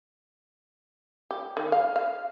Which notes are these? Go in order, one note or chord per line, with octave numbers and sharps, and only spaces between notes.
G4
D#3
F5
F5